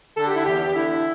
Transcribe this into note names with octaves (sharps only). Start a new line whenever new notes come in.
D3 A4
G4
E4
E2 G4
D3 E4